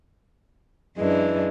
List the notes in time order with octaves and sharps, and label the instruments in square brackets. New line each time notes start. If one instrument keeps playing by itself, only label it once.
[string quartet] F#2 E3 G#3 D4